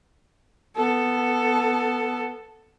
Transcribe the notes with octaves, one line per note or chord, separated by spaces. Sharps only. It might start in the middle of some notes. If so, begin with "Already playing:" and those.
B3 A4